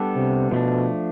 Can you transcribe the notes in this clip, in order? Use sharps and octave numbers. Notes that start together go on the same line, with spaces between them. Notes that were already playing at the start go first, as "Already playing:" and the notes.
Already playing: G3 B3 D4 A4
C3
B2 F3 A3 D4